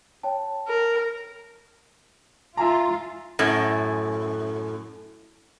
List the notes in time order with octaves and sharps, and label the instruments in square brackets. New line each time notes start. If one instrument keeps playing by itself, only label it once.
[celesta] C#5 G5 A5
[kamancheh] A#4
[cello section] F4 [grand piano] E5 G#5 A#5
[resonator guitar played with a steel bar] F#2 A2